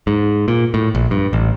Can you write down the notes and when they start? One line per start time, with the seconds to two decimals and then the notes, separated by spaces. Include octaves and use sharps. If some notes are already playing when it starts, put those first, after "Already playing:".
0.07 G#2
0.48 A#2
0.74 A2
0.95 A#1
1.11 G2
1.33 A1